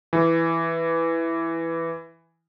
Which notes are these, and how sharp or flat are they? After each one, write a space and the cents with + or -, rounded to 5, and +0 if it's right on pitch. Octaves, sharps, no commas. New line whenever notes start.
E3 +5